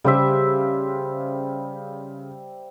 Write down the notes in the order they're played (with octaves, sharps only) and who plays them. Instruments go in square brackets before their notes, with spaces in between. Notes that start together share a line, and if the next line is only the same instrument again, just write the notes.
[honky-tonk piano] C#3 [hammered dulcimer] G3 C5 E5